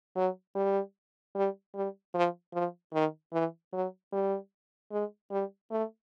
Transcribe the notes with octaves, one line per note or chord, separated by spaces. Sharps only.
F#3
G3
G3
G3
F3
F3
D#3
E3
F#3
G3
G#3
G3
A3